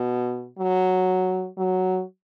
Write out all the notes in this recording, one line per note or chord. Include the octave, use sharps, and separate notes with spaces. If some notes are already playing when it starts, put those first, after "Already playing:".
Already playing: B2
F#3
F#3